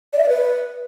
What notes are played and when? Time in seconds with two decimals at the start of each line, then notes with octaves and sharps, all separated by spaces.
0.13 D5
0.18 E5
0.24 D5
0.29 B4